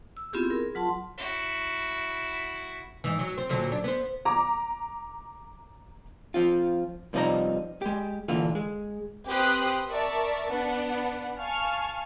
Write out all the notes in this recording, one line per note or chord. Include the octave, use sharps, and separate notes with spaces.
E6
B3 C4 E4 F4 G4 G#4
G#4 A#4
F#3 F4 F#5 A5 C6
E4 F#4
G#2 E3
F#3
C4
A#2 D3 F#3
D4
B3 C5
A#5 D6
F3 C4 F4
G2 C3 F3 D#4 D5 A#5
G#3 G4
A#2 D3 E3 F4
G#3
C4 G4 B4 C6 D#6 F#6
A#4 D5 E5 A5 C#6
B3 D4 B4 F#5
F5 G#5 A5 C#6 F6